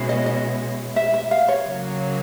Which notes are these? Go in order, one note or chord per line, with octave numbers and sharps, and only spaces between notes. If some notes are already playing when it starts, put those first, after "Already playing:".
Already playing: B2 G#3 C#4 E4
D#5
D#5
E5
E5
F5
C#5
C#3 F#3 A#3